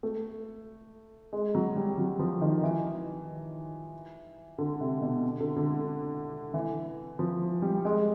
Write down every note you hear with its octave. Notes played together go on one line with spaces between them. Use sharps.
A3
G#3
F#3
G3
F#3
F3
D#3
E3
D3
C3
B2
D3
D3
E3
F3
G3
G#3